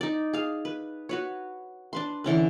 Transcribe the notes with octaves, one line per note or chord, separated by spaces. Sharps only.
D#4 D5
G#4 F5
B4
F#4 B4 C#5
D4 B4 C6
D3 E3 C#4 B4